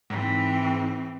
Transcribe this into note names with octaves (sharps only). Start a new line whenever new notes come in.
G#2 E3 C4